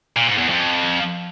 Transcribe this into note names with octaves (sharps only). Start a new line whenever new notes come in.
A#2
G#2
E2
F2